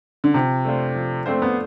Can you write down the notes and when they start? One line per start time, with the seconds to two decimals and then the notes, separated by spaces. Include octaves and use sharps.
0.24 D3
0.34 C3 F3
0.65 A3 D4 F4 C5
0.95 F3
1.26 A3 C4 D4 F4 C5
1.42 B3